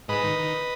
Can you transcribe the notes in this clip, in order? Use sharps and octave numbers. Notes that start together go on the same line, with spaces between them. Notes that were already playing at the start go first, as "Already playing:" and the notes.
G#2 B4 D#5
D#3
D#3